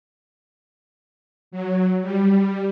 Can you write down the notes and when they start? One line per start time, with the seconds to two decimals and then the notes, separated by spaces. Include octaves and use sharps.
1.51 F#3
2.02 G3